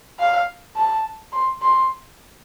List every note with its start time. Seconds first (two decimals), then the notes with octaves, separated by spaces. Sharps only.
0.19 F5
0.76 A5
1.33 C6
1.62 C6